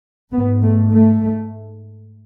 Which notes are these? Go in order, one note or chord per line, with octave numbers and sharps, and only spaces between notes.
G#2 B3
A3
A3